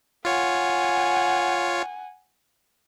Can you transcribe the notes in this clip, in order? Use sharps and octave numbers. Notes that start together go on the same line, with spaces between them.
F4 C#5 F#5 G#5